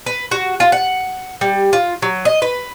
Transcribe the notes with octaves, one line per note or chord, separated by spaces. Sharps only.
B4
F#4
F4
F#5
G3
F4
F#3
D#5
B4